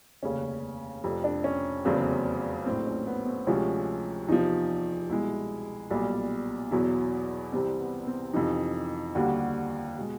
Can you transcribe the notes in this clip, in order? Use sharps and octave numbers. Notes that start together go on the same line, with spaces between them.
F1 D#2 C#3 C#4
F1 F2 C3
D4
C#4
F1 E2 C#3 F#3 C4
A#1 A2 F#3 C4
C#4
B3
C4
D2 C3 F3 G#3 C#4
E2 C3 F3 D#4
C2 B2 G#3 E4
B1 A#2 G3
E2 B2 F#3 E4
C2 C3 E3 G3 C4
B3
C4
F2 C3 E3 D#4
D#2 D3 G3 F#4
B2 G#3